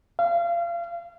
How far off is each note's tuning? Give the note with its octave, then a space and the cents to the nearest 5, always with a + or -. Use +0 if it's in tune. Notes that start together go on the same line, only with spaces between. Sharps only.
F5 -30